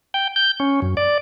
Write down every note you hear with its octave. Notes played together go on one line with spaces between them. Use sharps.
G5
G6
C#4
F#2
D5